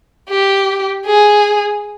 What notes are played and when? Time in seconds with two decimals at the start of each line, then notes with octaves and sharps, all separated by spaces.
0.30 G4
1.06 G#4